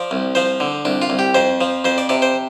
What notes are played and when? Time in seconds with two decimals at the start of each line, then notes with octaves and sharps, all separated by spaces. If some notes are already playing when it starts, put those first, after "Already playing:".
Already playing: F3 D5
0.11 C2
0.35 F3 C5
0.60 D3
0.85 C2 D4
1.02 F4
1.10 C2
1.19 G4
1.35 F2 C5
1.61 F3
1.84 F2 C5
1.98 D5
2.09 C3 D5
2.22 C5